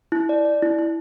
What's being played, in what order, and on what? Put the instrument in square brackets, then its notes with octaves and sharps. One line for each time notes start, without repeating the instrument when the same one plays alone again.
[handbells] E4
D5
D5
E4
E4